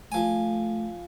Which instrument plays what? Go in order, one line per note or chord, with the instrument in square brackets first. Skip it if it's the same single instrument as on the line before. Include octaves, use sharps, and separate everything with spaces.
[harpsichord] F3 G#5 [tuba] A3